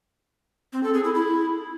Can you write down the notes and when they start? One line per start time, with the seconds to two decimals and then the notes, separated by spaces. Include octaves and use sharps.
0.73 C4
0.83 A4
0.94 G#4
1.04 E4
1.14 E4